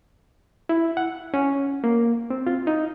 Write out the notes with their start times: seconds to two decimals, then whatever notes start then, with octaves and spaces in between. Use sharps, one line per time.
0.69 E4
0.97 F#5
1.34 C#4
1.84 A#3
2.30 C4
2.47 F4
2.67 D#4